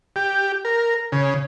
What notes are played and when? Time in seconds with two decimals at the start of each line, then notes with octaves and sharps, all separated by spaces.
0.16 G4
0.65 A#4
1.12 C#3